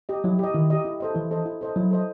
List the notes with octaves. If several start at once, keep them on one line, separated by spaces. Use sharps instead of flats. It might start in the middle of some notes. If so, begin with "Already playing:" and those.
G4 D#5
F#3 E4
G4 D#5
D#3 E4
G4 D#5
E4
A4 C5 D#5
E3 E4
A4 C5 D#5
E4
A4 C5 D#5
F#3 E4
A4 C5 D#5